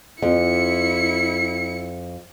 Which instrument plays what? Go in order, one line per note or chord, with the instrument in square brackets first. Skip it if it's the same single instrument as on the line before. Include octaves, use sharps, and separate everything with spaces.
[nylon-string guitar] F2 [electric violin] E4 C#7